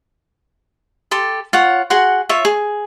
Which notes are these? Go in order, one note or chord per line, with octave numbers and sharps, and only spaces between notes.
G4 A4 C6
F4 C#5 F#5
F#4 G#4 F#5 C6
F4 C#5 E5
G#4